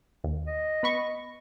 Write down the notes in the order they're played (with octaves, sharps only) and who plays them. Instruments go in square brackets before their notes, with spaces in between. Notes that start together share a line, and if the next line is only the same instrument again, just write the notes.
[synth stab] D#2
[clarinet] D#5
[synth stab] B3 B5 C#6